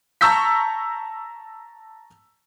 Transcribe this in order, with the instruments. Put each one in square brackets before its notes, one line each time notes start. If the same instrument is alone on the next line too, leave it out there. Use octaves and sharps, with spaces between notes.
[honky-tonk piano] A5 A#5 C#6 E6 G6 B6